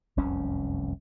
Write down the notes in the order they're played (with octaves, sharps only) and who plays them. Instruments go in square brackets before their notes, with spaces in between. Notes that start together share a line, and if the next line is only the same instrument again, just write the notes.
[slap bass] F1 C2 F#2 C#4